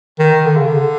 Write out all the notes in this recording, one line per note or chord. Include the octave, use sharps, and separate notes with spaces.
D#3
D3
C#3
D3